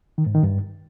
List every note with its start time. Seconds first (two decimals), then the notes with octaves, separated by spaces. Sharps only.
0.18 D#3
0.26 G#2
0.35 D#3
0.43 G2